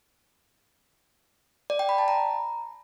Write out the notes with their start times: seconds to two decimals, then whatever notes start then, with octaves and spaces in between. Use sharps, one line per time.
1.70 D5
1.79 G5
1.89 B5
1.98 A5
2.08 A#5